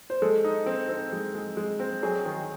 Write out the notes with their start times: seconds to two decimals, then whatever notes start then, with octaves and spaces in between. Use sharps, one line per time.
0.10 C5
0.22 G#3 A4
0.44 D#4
0.66 C4
0.89 C4
1.13 G#3
1.35 G#3
1.57 G#3
1.80 C4
2.03 F#3 G#4
2.25 D#3